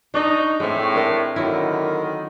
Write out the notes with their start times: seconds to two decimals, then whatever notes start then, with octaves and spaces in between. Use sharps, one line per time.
0.14 D4 D#4 D5 D#5 C#6
0.60 A2 G#3 C4
0.96 D4 A#4 D#5
1.36 D3 D#3 F#3 E4